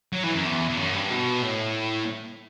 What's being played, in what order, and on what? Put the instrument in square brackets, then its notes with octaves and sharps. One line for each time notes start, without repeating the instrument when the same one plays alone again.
[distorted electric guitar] F#3
E3
F#2
E2
E2
F#2
G2
B2
A2